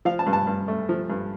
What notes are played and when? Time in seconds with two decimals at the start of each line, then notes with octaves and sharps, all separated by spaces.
0.05 F3 F5
0.19 A5
0.27 G2
0.33 A5
0.47 G2
0.68 A3
0.89 F3
1.10 G2